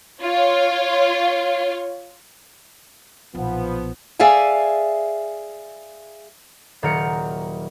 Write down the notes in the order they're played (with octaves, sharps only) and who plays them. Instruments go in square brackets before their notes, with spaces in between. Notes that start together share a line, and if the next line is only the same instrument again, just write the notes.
[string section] F4 C#5
[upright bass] B1 A#2 [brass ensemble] F3 B3
[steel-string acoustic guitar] G#4 D5 E5 F5 G#5
[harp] D#1 D#3 F#3 A#4 G5 C#7